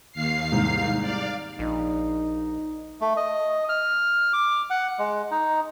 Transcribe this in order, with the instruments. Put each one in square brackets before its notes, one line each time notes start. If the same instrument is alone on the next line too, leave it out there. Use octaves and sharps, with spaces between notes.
[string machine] D#2 F5 C7
[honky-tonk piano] C2 G#2
[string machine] D5 F5
[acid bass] A#1 [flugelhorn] D#4
[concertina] A3
D#5
F6
D6
F#5
G#3
D#4